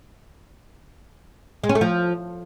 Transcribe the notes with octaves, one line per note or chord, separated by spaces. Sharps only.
G#3
C#4
A3
F3